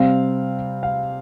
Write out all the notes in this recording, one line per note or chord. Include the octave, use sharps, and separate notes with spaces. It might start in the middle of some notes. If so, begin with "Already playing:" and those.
Already playing: C3 G3 C4 F5
F5